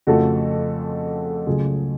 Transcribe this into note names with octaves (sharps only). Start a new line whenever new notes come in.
F2 C#3 F3 A3 F#4 A4
C#2 C#3 F#3 A3 F4 G#4